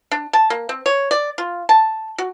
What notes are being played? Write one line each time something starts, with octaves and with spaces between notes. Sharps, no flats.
D4
A5
A#3
C4
C#5
D5
F4
A5
F#4